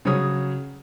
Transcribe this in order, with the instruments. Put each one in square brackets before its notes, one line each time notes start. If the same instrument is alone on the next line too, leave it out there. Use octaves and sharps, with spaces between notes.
[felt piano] C#3 F#3 G#4 C#5 D#6